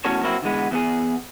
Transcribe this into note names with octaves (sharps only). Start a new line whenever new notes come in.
E2 A2 C#4 F#4 A4 C#5
F#3 A#3 C4 E4 F#4
D3 E3 G#3 B3
E2 B3 G#4